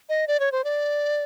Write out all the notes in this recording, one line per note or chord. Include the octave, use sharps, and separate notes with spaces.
D#5
D5
C#5
C5
D5